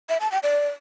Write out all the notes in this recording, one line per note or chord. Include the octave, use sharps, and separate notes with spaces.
E5
A5
G5
D5